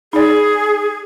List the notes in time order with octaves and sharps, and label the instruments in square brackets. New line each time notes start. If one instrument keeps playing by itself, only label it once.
[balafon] D#4 D5 [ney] G#4